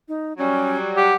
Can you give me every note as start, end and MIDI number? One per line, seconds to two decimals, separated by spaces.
0.08 0.33 63
0.38 1.14 54
0.38 1.14 55
0.38 0.77 61
0.97 1.15 67
0.97 1.16 78